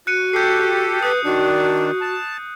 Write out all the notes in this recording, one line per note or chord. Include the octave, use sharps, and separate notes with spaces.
F#4 F#6 C#7 D#7
G4 A4 G6 C7
B4 D#6 F#6 G6
D#3 D4 F#4
A5